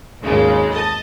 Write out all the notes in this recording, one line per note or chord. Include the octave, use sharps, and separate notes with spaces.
G#1 D#2 G#2 C#3 G#3
D#5 A5